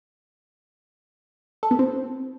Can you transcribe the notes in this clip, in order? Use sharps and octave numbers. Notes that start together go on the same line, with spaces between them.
A4
B3
C4